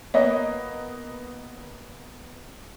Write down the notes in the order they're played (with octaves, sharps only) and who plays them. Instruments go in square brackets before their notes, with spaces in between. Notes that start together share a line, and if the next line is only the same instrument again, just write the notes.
[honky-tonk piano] A#3 B3 D#5 [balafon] C#5